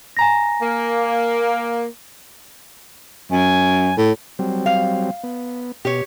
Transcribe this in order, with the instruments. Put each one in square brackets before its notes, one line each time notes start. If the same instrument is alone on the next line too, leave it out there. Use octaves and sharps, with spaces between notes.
[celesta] G#5 A#5 A#6
[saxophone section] A#3
[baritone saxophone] F#2 [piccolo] G#5
[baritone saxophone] A2
[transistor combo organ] F#3 G3 C4
[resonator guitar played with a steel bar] F5
[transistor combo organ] B3
[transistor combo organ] B2 [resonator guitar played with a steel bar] G4 C#5